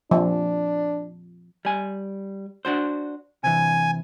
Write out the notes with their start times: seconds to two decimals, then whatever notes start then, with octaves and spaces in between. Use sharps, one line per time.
0.11 F3 D4
1.65 G3 G#5
2.65 D4 F#4 C5
3.44 C3 E3 G#5